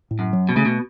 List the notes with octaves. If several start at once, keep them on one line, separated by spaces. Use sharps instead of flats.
A2
F#2
F#3
B2
C#3 A3
B2